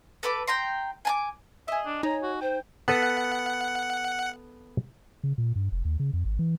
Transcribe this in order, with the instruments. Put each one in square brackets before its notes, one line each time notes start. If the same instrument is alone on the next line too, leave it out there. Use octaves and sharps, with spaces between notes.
[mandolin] A4 B4 B5 D6
G5 A#5 C6
G#5 A5 D6
[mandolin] G#4 D#5 [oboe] E5
[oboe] D4
[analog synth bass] D#4 [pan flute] C#5 [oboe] A#5
[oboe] F#4
[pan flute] C5 [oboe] G5
[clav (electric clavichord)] B3 A4 B4 [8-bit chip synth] F#5
[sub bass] C#3
A#2
G2
F1
D#2
C#3
F2
G#1
E3